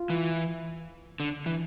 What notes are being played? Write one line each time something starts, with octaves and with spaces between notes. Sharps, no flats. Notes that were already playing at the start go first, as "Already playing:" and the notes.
Already playing: F4
E3
D3
E3